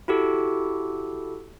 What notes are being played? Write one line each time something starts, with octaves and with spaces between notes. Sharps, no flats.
E4 F#4 G4 A4